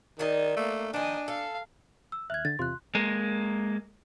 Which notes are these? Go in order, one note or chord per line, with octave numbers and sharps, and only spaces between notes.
D#3 D4 D#4 D#5
A3 A#3
D#3 F3 D4 D#5 G#5
A4 F5
E6
D#2 E5 F6 F#6 G#6
D3 A6
E2 C3 F4 C6 F#6
G#3 A#3